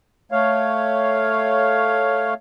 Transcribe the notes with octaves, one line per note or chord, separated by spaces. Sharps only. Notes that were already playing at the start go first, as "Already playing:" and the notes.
A3 C#5 F5